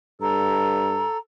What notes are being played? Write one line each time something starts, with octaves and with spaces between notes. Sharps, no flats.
G2 A4 A#5